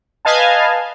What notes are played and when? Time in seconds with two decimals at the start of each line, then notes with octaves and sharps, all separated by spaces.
0.25 B4 D#5 F5 G#5 A5